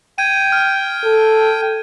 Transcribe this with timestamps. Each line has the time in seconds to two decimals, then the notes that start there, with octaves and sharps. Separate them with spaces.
0.18 G5 G#6 D#7
0.52 F6
1.05 A4